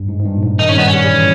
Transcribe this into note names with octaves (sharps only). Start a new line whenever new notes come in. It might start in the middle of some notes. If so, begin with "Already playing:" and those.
Already playing: G2
G#2
G#2
G2
A#2
G#2
D#3 D#4
C#4
G3 B3
G3 C#4
G3
E3